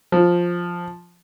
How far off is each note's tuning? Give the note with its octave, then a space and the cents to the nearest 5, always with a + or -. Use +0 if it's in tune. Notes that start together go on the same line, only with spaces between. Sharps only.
F3 +5